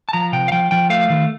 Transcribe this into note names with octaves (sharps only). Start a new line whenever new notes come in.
A5
F3 A#5
C3 G5
F5
F3 G5
F3 G5
A3 F5
D#3